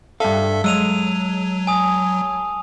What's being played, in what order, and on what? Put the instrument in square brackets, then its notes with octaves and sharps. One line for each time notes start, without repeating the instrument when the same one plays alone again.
[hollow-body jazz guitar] G2 F5 [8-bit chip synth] A4 E5 [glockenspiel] A5
[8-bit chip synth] F#3 [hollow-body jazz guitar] G#3 [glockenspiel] E6 D#7 F7
[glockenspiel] G#5 D#6